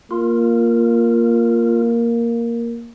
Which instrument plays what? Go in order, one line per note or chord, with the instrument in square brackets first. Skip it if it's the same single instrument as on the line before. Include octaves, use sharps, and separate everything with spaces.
[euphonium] A#3 [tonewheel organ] F4